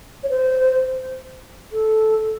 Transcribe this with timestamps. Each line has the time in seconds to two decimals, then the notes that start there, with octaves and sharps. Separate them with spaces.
0.23 C#5
0.30 C5
1.72 A4